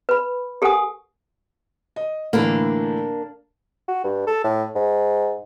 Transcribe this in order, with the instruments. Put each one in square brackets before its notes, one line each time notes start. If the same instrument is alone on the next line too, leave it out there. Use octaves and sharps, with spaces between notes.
[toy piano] B4 B5
G4 A4 A#4 F#5 G#5 D#6
[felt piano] D#5
[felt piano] A2 D3 E3 [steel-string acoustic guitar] A#3 D4
[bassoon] F#4
G2
A4
A2
G#2